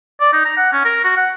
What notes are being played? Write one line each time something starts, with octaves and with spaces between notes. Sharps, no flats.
D5
D#4
A#5
F#5
C#4
A#4
F#4
F#5